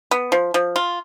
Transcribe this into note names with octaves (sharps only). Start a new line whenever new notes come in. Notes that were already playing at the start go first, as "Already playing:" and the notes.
B3
F3
F3
F4